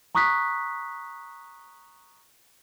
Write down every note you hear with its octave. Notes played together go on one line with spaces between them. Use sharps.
A#5 C#6 D#6 F#6 B6